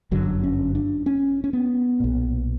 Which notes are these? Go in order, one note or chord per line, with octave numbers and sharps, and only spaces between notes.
G1 F#2 D3 F#3
C#4
D4
C#4
C#4
B3
B1 A#2